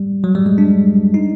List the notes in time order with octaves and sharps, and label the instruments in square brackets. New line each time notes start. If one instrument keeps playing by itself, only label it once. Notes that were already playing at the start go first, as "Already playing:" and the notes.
Already playing: [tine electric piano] G3
F#3
G3
G#3
D4
D#4